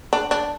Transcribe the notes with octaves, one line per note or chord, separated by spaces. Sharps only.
D4
D4